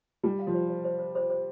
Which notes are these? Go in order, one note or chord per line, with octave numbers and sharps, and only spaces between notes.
G3 A5
F5
F3
C5
C5
C5
C5
C5
C5